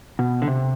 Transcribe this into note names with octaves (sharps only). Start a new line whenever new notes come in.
B2
D3
C3